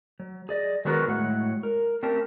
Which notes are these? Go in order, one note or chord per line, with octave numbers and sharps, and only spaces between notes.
F#3
G#4 D5 D#5
D#3 F#3 G#3 B3 F#4 A#4
A2 F#3 G#3 F#5
A#4
A3 C4 C#4 G4 A#4 A5